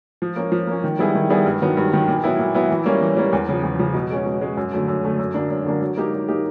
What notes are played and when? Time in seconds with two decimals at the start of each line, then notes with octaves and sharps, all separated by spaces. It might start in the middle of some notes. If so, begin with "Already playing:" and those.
0.22 F3
0.36 A#3 C#4
0.52 F3
0.67 A#3 C#4
0.84 D#3
0.99 G3 B3 E4 G#4
1.15 D#3
1.30 G3 B3 E4 G#4
1.46 G2
1.62 D#3 F#3 B3
1.77 G2
1.93 D#3 F#3 B3
2.08 A#2
2.24 F#3 B3 E4
2.39 A#2
2.55 F#3 B3 E4
2.70 E3
2.86 G3 A#3 C#4
3.01 E3
3.16 G3 A#3 C#4
3.33 E2
3.49 C#3 F3
3.63 E2
3.79 C#3 F3
3.94 B2
4.11 G#3 C#4
4.26 B2
4.41 G#3 C#4
4.57 F#2
4.73 D3 F#3 A3
4.88 F#2
5.04 D3 F#3 A3
5.19 F#2
5.34 D3 F#3 A#3 D4
5.50 F#2
5.65 D3 F#3 A#3 D4
5.82 F#3
5.97 A#3 D#4 G4
6.13 F#3
6.28 A#3 D#4 G4